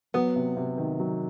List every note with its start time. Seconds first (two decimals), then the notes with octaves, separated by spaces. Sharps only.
0.14 F#3 B3
0.36 C3
0.57 C3
0.78 D#3
1.00 F#3